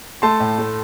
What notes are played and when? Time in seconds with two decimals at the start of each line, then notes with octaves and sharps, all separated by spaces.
0.22 A3 A5 C6
0.40 A2
0.58 A3